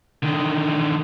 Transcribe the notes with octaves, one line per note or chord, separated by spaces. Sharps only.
D3 D#3